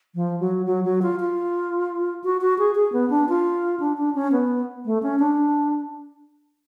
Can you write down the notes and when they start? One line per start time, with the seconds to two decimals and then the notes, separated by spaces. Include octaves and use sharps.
0.15 F3
0.40 F#3
0.66 F#3
0.84 F#3
1.02 F4
1.20 F4
2.24 F#4
2.41 F#4
2.59 G#4
2.75 G#4
2.93 B3
3.10 D4
3.29 F4
3.80 D4
3.97 D4
4.15 C#4
4.32 B3
4.85 A3
5.03 C#4
5.19 D4